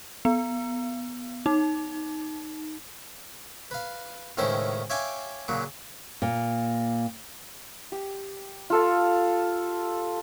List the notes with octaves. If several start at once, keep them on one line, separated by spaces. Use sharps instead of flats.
B3
D#4
B4 F5
C#2 A2 D#3 C#4 C5 E5
C#5 E5 F5 G5 G#5 D6
A#2 C#3 F#3
A#2
G4
F4 A4 F5